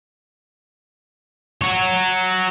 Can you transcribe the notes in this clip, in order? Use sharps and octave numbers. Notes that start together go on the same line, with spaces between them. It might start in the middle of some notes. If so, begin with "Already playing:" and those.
F#4 C#5